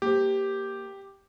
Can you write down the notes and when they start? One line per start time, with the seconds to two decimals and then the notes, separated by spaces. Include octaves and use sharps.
0.02 A#3 G4 C5